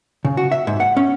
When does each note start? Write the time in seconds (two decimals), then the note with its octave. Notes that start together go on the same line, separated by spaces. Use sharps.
0.25 C#3
0.37 F#4
0.52 E5
0.67 G#2
0.80 F#5
0.97 C#4